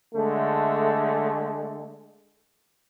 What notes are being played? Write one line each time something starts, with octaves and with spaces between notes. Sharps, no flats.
D3 G#3 A3